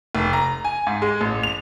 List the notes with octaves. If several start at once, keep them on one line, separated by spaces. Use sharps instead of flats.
F1
A#5
G#5
G#2
G#3
A1
F7